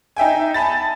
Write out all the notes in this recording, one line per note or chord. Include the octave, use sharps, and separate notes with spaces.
D#4 E5 G5 G#5
G#5 A5 B5 A6